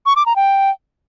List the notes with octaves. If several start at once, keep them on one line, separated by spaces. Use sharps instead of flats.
C#6
D6
A#5
G5